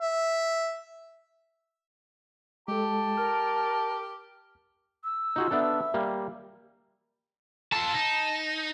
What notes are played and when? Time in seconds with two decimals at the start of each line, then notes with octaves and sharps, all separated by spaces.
0.01 E5
2.68 G#3 G4 A4 A5
3.17 A#4 F6
5.04 E6
5.36 D#4 F4 F#4 G#4
5.51 B3 D4 A4 E5
5.94 G3 A#3
7.72 F4 A4 A5
7.94 D#4